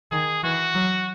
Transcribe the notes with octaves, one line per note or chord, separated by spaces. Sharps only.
D#3 G#4
E3 F#4
F#3